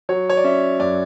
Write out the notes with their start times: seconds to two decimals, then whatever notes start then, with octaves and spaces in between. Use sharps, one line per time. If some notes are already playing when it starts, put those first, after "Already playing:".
0.09 F#3 C#5
0.30 C#5
0.37 D5
0.44 C#4 E5
0.80 F#2 D5